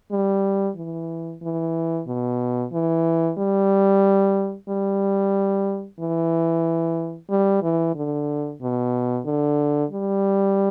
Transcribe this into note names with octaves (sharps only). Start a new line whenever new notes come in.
G3
E3
E3
B2
E3
G3
G3
E3
G3
E3
D3
B2
D3
G3